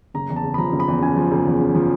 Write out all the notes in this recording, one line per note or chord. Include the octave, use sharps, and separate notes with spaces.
F#1 A#5
E2
A5
C#3
B5
F3 A#5
F#1
B5
E2
C#3 G#5
F3
F#1
E2
C#3
F3